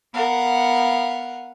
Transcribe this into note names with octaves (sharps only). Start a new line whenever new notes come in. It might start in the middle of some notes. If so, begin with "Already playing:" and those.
B3 A#4 F5 F#5